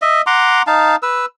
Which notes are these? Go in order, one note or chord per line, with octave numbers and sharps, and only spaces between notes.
D#5 E5
F#5 A#5 C6 D6
D#4 F5 A5
B4 E6